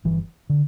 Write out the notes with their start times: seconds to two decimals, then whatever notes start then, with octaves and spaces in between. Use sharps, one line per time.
0.05 G1 E3
0.50 D3